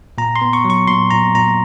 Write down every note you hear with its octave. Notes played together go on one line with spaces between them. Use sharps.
A#2 A#5
C6
B3
C#6
F#3
C#6
A#2 C6
A#2 A#5
A#2 A#5